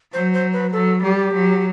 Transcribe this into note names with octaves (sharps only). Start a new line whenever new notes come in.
F#3 C5
C5
B4
F#3 A4
G3 G4
F#3